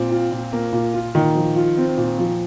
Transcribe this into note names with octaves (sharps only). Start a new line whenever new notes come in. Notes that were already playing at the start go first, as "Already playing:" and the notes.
Already playing: A#2 C4
F4
A#2
A#3
A#2
F4
A#2 D#3
F3
F4
C4
A#2
F3